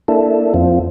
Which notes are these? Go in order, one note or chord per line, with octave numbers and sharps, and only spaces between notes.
A#3 D4 E4 A4
F2 C4 F4